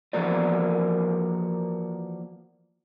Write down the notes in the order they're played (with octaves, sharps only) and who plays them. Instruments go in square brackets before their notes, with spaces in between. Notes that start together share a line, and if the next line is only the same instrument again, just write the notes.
[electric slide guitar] E3 F3 A#3 F#4 A#4 D5